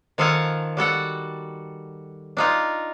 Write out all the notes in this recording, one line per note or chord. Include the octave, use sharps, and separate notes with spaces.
D#3 F3 A4 F5 F#5 G#5
G3 F#4 A4 F#5
D4 D#4 F4